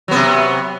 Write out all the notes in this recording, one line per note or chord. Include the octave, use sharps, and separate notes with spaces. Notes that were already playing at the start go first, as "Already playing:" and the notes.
C3 F#3 B3